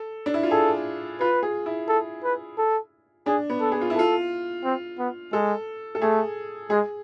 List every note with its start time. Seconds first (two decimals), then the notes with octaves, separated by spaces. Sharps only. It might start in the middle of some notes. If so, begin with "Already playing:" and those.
Already playing: A4
0.26 D4
0.34 E4
0.43 F4
0.51 G#4 A4
1.20 F4 B4
1.43 G#4
1.66 E4
1.88 A4
2.24 B4
2.58 A4
3.26 D4 G#4
3.50 B3
3.61 A4
3.72 G#4
3.81 F4
3.90 E4
3.95 F4 A4
4.64 C4
4.99 B3
5.33 G#3 A4
5.95 A4
6.02 A3 G#4
6.70 G#3 G#4